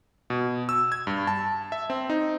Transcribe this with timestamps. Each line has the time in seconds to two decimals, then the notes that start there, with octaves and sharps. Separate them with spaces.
0.30 B2
0.69 E6
0.92 G#6
1.07 G2
1.27 A5
1.72 E5
1.90 C4
2.10 D#4